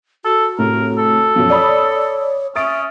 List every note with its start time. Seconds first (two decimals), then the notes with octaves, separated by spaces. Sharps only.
0.25 F#4 A4
0.59 A2 C3 A#4
0.98 A4
1.36 F#2 B2 F3
1.50 C#5 D5 B5 D#6
2.55 C#4 E5 D#6 A6 D7